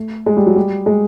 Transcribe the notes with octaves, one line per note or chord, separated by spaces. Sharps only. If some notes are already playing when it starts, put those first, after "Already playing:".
Already playing: A3
G#3
G3
F#3
G3
G#3